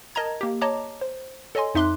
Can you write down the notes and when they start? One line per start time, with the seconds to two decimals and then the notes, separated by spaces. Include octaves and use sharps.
0.15 A#4 D#5 A5 A#5 G#6
0.41 A#3 G4
0.61 C#5 D#5 A5 A#5 D6
1.01 C5
1.55 A4 C#5 D#5 G#5 C6
1.74 F2 D#4 E5 C6 D6 F#6